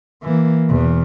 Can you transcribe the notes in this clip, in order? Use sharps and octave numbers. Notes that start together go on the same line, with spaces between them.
E3 A#3
E2 B2